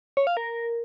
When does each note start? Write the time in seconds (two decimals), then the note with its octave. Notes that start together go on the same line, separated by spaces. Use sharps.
0.17 C#5
0.27 F5
0.37 A#4